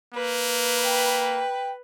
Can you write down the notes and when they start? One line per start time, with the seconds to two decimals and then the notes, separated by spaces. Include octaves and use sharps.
0.14 A#3 B4
0.84 G5